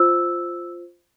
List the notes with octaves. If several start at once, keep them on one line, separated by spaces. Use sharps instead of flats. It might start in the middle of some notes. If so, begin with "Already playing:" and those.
Already playing: F4 C5 E6